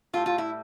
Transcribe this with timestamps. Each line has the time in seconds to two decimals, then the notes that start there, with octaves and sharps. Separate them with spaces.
0.13 A2 F4
0.17 G3
0.26 F4
0.38 E4